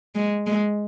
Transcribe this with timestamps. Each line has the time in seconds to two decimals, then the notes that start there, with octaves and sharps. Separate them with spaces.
0.15 G#3
0.46 G#3